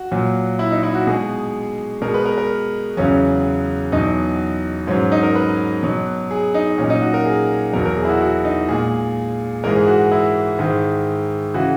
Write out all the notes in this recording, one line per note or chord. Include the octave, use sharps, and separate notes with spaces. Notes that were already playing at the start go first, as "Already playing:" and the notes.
Already playing: F#4
A#2 F#3
E4
D#4
E4
F#4
B2 G#3 G#4
B2 G#3 A#4
B4
A#4
A#4
E2 C#3 F#3 C#4
E2 B2 F#3 D#4
G#2 F#3 C#4
D#4
A#4
B4
B2 F#3
G#4
D#4
A#2 F#3 C#4
D#4
F#4
A#4
G#4
E2 B2 F#3 A#4
A#4
G#4
E4
F#4
F#4
D#4
A#2 G#3 G#4
G#2 E3 G#3 A#4
G#4
F#4
E4
G#2 D#3 G#3
C#3 E3 F#4